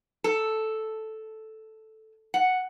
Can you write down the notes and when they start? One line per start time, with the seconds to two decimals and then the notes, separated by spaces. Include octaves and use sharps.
0.24 A4
2.34 F#5